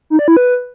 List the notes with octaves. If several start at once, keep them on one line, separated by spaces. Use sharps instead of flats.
D#4
D5
E4
B4